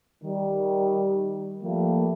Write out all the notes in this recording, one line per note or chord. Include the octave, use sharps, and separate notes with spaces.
D#3 G3
F3 G3 A3 A#3